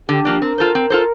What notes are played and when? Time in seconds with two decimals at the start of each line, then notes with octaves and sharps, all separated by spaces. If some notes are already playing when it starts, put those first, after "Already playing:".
0.09 D3 G4
0.25 F3 A#3 D4
0.42 C4 A#4
0.58 F4 A4 C5
0.75 C4
0.90 F4 A4 C5